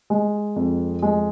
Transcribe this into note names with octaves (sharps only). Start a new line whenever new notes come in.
G#3
F2
G#3